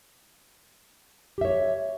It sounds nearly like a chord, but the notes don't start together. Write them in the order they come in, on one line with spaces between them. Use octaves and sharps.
G4 E5 C#5